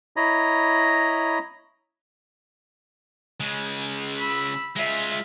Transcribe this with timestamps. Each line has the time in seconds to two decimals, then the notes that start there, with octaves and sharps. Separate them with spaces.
0.16 E4 C#5 D#5 A#5 B5
3.40 C#3 G#3
4.17 B5 E6
4.76 G#3 F4 E5